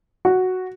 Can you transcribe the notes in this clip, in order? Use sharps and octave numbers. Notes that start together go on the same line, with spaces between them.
F#4